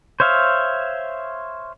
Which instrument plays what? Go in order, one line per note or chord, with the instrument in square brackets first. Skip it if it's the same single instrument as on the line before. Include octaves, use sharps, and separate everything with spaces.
[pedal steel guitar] C5 C#5 E5 F5